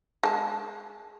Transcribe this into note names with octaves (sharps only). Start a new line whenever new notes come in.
G#3 A5